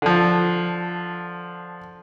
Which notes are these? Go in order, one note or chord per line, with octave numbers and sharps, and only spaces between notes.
D3 F3